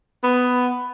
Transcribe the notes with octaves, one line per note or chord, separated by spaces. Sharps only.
B3